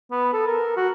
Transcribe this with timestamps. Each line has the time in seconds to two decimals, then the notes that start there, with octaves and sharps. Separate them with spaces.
0.11 B3
0.33 A4
0.47 A#4
0.77 F#4